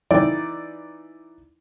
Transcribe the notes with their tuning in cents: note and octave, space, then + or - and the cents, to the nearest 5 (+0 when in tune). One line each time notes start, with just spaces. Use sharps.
E3 +0 D#4 +0 D5 +0